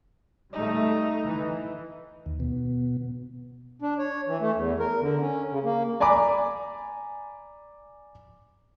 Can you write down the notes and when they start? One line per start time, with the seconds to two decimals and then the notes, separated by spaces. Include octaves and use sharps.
0.53 G3 A3 D#4
1.22 E3
2.26 D#2
2.40 B2
3.82 D4
3.99 C#5
4.28 E3
4.41 A3
4.55 E2
4.79 A#4
5.01 D3
5.20 C#4
5.51 C#3
5.64 A#3
6.00 D5 G#5 A#5 B5 D6